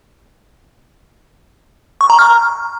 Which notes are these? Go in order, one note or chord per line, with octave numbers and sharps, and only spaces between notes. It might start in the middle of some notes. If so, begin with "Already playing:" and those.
C#6
A#5
F6